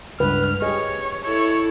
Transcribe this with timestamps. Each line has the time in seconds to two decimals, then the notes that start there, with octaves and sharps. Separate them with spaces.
0.20 C#2 G2 B4 F6
0.62 G4 G#4 C#5 D#5
1.24 E4 A4 C#5